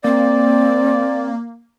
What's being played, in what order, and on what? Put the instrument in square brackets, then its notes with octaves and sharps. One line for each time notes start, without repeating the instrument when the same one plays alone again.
[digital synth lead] A#3 [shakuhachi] C4 [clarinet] D5